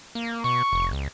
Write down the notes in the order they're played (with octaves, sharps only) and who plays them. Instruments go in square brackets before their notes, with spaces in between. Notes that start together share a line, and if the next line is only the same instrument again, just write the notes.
[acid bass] A#3
[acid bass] B2 [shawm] C#6
[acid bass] F1
C#2